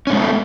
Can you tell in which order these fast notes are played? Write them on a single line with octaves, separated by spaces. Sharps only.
C#4 G#2 G#3 B3 A3